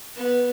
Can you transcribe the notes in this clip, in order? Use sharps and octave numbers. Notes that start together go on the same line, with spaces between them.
B3